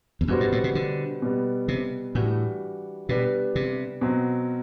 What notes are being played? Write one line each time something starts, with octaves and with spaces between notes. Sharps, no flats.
E2
F#2 B2 G3 B3 F#4 C5
G2
A2
C3
D3
B2 G3 B3
C3
A2 E3 G3 D4 F#4
B2 G3 B3 D4 G4 B4
C3
B2 F#3 C4